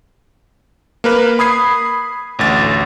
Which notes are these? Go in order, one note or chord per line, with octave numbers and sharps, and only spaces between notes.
A#3 A#4 B4
B5 D#6 G#6 C7
A1 D2 A6